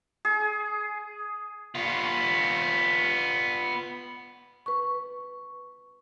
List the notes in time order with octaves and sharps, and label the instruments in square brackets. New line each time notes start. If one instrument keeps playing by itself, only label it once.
[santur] G#4
[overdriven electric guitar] B3 F4
[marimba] B4 C#6